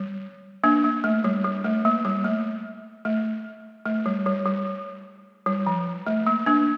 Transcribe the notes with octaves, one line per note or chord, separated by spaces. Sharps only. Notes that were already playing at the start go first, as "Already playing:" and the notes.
Already playing: G3
A#3 D4
A#3
A3
G3
G3
A3
A#3
G3
A3
A3
A3
G3
G3
G3
G3
F3
A3
A#3
A#3 D4